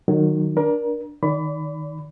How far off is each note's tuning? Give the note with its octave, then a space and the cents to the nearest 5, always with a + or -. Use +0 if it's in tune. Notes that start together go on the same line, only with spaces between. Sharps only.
D#3 -20 F#3 +0
D4 +0 A#4 +25
D#3 +0 D5 -30 B5 +25